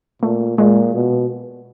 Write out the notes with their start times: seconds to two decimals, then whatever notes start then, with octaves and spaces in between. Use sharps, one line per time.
0.22 A#2 A3
0.58 A#2 G#3
0.94 B2